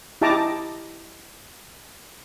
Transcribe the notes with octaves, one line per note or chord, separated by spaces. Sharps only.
E4 G4 D#5 A5 A#5 D6